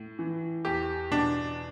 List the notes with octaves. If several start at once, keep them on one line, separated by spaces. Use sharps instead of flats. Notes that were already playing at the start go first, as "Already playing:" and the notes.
Already playing: A2
E3
E2 G4
B2 D4